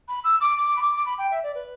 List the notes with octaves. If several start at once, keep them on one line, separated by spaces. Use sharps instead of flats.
B5
E6
D6
D6
B5
D6
D6
B5
G5
E5
D5
B4